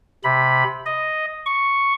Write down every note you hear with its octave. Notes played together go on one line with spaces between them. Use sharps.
C3 B5
D#5
C#6